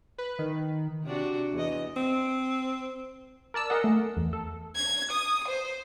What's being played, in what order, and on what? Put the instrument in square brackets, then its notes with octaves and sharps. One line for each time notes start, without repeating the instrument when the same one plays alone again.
[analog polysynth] B4
D#3
[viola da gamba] C3 D4 F#4
E2 D#5
[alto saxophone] C4
[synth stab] A#4 D5 A5 E6
G#4 A#4 D#5 F#5
A3
E2
A4
[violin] G#6
D#6
C5